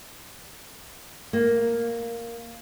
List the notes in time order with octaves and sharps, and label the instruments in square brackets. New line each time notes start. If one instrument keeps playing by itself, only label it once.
[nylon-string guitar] A#3